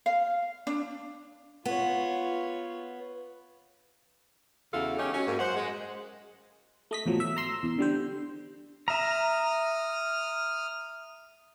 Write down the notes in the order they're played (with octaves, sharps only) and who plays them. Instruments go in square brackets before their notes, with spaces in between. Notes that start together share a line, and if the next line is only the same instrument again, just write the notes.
[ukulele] F5
D4
[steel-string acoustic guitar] B3 [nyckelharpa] F4 C#5
[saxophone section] E2 C#3 E4 F#4 A4 F5
G#3 C#4 D#4 G4
C#4 F#4
G#2 A#3 F#4
F#2 C5 F#5
G#3
[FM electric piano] A3 D#5 B6
E2 A2 F3 F#3
E5
A#5 C6 E6
E2
D3 G3 C5
[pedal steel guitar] E5 A#5 [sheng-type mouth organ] D#6 F6